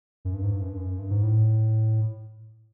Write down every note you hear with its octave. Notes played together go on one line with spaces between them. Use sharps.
F#2
G2
G#2
G2
F#2
G2
F#2
G2
G#2
A2